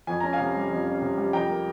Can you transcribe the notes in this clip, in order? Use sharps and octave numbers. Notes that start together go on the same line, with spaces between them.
F2 G#5
C#4 A#5
F5 G#5
C3
G3
F2
C#4
C3
G3
F2 G5 A#5
A#3